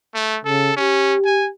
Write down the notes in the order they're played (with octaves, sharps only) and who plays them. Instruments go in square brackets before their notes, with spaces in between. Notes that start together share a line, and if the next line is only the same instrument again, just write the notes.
[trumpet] A3
[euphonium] C#3 [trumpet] A4
[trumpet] C#4 [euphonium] G4
[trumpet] G#5